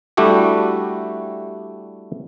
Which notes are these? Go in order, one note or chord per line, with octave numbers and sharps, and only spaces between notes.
G3 A3 D4 E4 F#4 G4